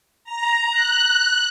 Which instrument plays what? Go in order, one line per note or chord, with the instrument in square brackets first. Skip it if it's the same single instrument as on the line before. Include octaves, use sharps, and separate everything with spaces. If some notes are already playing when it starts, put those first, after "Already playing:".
[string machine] A#5
F#6